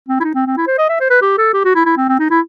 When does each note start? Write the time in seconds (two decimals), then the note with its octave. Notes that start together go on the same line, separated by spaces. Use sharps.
0.08 C4
0.20 E4
0.24 D#4
0.34 C4
0.46 C4
0.57 E4
0.67 C5
0.78 D#5
0.89 E5
1.00 C5
1.10 B4
1.22 G4
1.38 A4
1.53 G4
1.65 F#4
1.75 E4
1.86 E4
1.97 C4
2.09 C4
2.19 D#4
2.30 E4